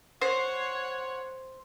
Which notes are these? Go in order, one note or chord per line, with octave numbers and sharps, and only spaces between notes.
C5 C#5 F#5